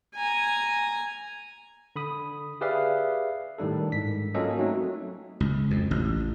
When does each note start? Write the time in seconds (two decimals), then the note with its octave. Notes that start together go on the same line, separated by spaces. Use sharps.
0.14 G#5 A#5
1.96 D3 B5 D#6
2.61 G4 G#4 B4 D5 E5 F5
3.58 A2 D#3 G3 D4 A4
3.92 G#2 B6
4.34 F#3 A#3 C#4 F4 A4 D#5
4.58 F#3 A3 C4 D#4 F#4
5.40 C#2
5.71 F2
5.91 A1